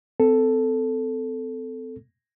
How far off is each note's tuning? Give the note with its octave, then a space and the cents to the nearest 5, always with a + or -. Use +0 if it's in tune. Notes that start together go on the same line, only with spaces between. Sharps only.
C4 -35 A4 +0